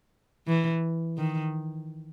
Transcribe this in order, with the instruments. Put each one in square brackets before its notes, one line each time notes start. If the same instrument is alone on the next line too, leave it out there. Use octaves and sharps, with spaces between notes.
[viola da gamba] E3
D#3